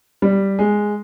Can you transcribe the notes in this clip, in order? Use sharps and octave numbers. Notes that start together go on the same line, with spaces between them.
G3
G#3